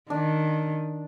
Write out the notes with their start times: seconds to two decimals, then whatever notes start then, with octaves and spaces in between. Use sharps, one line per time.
0.10 D#3 D4